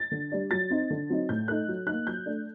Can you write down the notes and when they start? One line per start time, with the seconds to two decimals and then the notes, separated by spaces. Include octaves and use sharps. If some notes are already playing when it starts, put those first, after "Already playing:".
Already playing: A6
0.11 D3
0.32 G3 D4
0.51 F#3 A6
0.70 C4 D#4
0.90 D3
1.10 F#3 C4 D#4
1.29 A2 G6
1.48 A3 D#4 F#6
1.68 F#3
1.87 A#3 D#4 F#6
2.07 F#3 G6
2.26 A3 D4